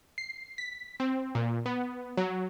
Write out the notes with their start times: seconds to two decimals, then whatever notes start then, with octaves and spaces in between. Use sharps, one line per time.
0.18 C7
0.58 B6
1.00 C4
1.35 A#2
1.66 B3
2.17 F#3